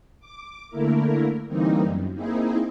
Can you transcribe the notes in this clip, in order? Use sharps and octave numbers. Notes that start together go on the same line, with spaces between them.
D6
D3 A3 A#3 E4 A#4
D3 E3 G3 A#3 C4 D#4
F#2
A#3 C4 D#4 E4 G#4